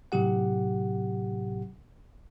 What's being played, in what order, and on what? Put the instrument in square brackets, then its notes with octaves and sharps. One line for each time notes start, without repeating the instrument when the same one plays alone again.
[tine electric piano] A2 C3 F#3 G4 F#5